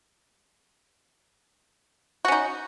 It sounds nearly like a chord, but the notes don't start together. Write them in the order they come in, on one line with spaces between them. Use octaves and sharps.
F#4 C#4 D#4